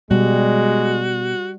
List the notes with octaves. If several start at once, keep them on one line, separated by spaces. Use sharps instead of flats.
B2 G3 G#3 F#4